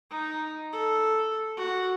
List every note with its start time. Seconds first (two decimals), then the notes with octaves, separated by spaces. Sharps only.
0.10 D#4
0.72 A4
1.57 F#4